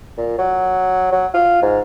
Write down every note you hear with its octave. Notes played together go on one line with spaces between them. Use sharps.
A#2
F#3
F#3
F4
G#2